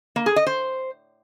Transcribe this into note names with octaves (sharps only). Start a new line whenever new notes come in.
A#3
G#4
D#5
C5